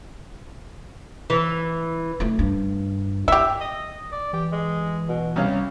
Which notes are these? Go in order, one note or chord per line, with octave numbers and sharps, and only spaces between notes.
E3
A3 E4
G2
E4 G4 E5
D#5
D5
E3 G4
G#3
B2
C2 C#4 F5